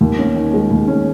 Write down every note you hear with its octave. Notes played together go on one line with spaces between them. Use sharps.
D#2
C#4
D#3
G#3
D#2
C#4